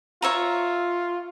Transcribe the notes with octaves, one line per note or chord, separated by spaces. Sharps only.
F4 C#5 E5 A#5